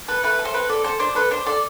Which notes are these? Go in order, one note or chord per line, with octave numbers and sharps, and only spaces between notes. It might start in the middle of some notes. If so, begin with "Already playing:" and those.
A4 B4
A3 B4
A4
C5
C4 B4
A4 D5
A4 C5
D4 C5
A4 B4
D4 C5
A4 D5